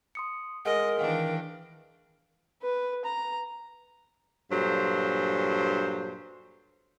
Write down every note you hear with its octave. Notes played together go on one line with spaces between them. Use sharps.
C6 D#6 C#7
G#3 A#4 D#5 F#5
D#3 E3 D4 F5 G5
B4
A#5
G2 A#2 F#3 A4 C5